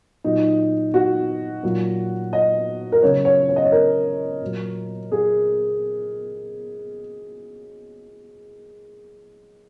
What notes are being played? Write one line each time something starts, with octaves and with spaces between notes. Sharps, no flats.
A#2 F#3 D#4
F#4
A#2 F#3
D#5
A#4
C#3 F#3 C#5
C#5
C#5
D#5
C#5
A#4
A#2 F#3
G#4